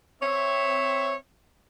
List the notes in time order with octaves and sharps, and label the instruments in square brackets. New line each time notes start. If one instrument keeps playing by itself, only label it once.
[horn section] C4 C#5 E5